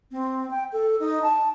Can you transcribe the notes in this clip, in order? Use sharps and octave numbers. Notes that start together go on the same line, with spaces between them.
C4
G5
A4
D#4
A5